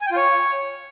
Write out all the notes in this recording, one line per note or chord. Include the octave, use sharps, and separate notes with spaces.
G#5
G5
F4
C#5